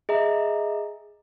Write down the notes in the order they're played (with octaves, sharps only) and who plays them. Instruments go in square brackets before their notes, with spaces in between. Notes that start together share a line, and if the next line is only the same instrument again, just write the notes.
[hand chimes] G#4 D#5 E5 A#5